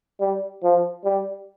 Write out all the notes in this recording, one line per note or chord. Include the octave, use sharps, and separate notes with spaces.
G3
F3
G3